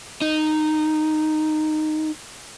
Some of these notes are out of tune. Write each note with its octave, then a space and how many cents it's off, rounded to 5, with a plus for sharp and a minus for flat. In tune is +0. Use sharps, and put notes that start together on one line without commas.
D#4 -10